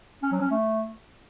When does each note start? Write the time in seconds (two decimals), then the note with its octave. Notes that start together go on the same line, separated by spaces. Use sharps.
0.23 C#4
0.32 F#3
0.41 C#4
0.51 A3